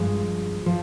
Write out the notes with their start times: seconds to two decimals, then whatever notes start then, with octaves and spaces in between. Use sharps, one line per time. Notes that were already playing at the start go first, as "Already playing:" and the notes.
Already playing: G2 F3 G#3
0.66 F3